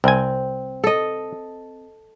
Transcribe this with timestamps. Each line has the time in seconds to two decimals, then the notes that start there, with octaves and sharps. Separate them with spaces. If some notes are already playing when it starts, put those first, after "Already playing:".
0.04 C2 C4 G#5
0.84 A4 D#5